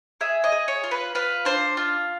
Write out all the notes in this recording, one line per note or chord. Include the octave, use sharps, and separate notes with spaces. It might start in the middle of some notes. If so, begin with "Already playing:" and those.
G#4 E5
D#5
G#4
C#5
F4
B4
F4 B4
D4 C5
F4